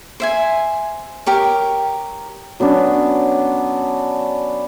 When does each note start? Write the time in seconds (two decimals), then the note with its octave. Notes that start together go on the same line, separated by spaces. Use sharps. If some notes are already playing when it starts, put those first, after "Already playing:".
0.20 C5 E5 G#5
1.26 G4 A#4 C#5
2.60 F#3 B3 C#4 D4